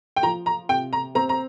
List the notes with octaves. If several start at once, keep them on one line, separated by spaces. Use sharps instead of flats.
G5
F3 A#5
A#5
C3 G5
A#5
C4 A#5
A#5